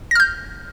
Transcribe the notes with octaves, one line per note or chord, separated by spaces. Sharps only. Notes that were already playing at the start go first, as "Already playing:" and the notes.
F6 G6 A#6